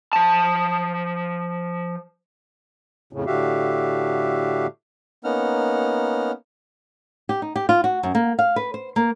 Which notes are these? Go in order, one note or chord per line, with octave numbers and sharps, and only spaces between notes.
F3 A5
F2 A2 C#3
A2 D3 F#4 G4 E5 F5
A#3 B3 C#4 D#4 F#5 F6
G4
D#4
G4
F4
F#4
F#2
A#3
F5
B4
C5
A#3